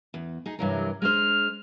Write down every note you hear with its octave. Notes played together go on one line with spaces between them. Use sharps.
E2
D#4 G#4
G2 C3 E3 F#3 A#4
G#3 D4 C5 F6